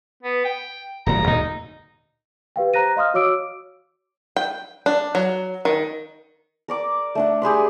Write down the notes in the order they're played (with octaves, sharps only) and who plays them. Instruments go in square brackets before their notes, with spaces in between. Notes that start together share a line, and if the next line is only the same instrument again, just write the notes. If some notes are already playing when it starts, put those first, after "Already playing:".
[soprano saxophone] B3
G5
[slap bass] D#1 A2 F#3 [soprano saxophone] A#5
[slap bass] D2 A#2 D3 [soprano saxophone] D#4
[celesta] G4 B4 F5 G5
C5 A#5 F#6 A#6 D#7
D#5 F5 C6 D#6 F6
F#4 C#5 D6 E6 D7
[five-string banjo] G5
D4
F#3
D#3
[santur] A#4 D5 D6
A3 D4 F#5
G4 G#4 B4 C6